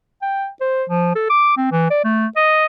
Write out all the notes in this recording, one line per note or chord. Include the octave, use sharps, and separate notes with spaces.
G5
C5
F3
A4
D6
C4
E3
D5
A3
D#5